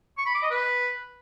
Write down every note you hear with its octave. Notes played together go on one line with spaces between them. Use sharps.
C#6
B5
D6
D#5
B4